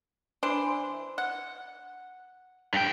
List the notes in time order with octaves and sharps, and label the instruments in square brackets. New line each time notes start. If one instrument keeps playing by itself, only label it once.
[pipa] E3 D4 C5
F#5
[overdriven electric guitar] G2 G5